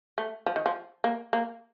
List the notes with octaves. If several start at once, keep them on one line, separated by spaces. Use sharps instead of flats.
A3
F3
D#3
F3
A#3
A#3